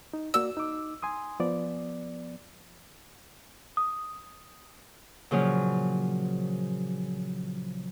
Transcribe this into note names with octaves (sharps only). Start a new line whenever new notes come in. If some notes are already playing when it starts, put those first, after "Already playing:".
D#4
A#3 F#4 D5 E6
D#4 D6
G#5 C6 D#6
F3 B3 D5
D#6
A#2 C#3 F3 F#3